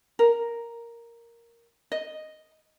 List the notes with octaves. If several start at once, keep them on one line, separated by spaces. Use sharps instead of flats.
A#4
D#5